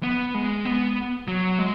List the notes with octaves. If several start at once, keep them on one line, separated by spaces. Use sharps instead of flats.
B3
G#3
B3
F#3
G#3